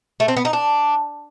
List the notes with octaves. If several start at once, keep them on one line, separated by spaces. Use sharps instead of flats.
A3
C4
B3
D#4
D4